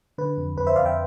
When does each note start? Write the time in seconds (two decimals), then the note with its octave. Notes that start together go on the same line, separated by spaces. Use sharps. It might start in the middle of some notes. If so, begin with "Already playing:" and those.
0.18 D3 B4
0.37 F2
0.57 F2 B4
0.67 C5 E5
0.76 F2 D5 F5
0.86 E5 G5